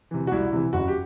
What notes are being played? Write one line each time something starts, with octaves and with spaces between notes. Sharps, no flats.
C3 E3
F#4
C2 E4
C3 E3
F#1 F#4
G4